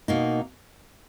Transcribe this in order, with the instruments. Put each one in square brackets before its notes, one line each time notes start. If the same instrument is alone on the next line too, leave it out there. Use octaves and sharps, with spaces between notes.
[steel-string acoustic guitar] B2 A#3 D#4